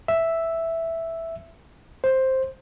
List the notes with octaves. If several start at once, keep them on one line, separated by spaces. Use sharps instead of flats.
E5
C5